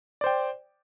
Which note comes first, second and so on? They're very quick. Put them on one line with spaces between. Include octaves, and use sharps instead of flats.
D5 C5 G5